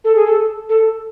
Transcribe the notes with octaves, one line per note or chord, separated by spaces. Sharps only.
A4
G#4
A4
A4